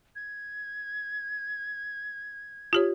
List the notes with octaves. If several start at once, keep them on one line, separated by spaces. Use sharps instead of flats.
G#6
F4 G4 C#5